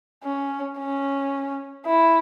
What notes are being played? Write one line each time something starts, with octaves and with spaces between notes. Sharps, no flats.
C#4
C#4
E4